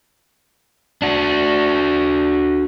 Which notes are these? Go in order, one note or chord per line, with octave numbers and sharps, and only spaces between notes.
D4 F#4